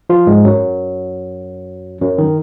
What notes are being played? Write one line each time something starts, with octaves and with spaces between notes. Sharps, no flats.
F3 F4
G#2 G#3
F#2 F#3
F#2 F#3
D#3